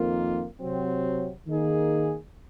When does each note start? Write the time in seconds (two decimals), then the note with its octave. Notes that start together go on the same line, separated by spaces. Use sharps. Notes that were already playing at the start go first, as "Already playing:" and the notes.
Already playing: F2 D#3 A#3 F4
0.61 C3 F#3 C4
1.47 D#3 A#3 D#4 G#4